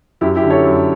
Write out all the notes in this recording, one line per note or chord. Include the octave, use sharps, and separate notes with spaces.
F#2 E4 G4
E4 G4
D3
A4 C#5
F#2